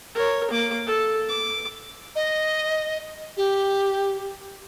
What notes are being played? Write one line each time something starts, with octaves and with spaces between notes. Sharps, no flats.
A#4 C#5
A#3 D6
A4
D6
D#5
G4